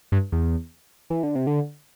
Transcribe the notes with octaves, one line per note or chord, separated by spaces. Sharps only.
G2
E2
E3
D3
C3
D3